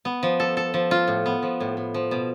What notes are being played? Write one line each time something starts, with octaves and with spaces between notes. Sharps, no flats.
B3
F3
A4
A4
F3
F4
A2
B3
F3
A2
A2
F3
B2